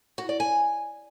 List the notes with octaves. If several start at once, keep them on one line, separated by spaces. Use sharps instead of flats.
F#4
D5
G#5